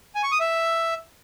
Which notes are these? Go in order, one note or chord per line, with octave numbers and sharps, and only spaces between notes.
G#5
C#6
D#6
E5